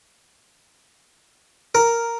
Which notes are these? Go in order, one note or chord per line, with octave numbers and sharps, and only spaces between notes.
A#4